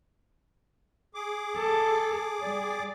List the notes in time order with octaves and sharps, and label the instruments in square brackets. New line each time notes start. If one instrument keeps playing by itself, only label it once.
[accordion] G#4 D6
[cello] A4
G3 D5